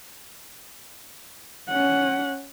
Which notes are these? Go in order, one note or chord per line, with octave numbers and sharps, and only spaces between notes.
C#4 F#5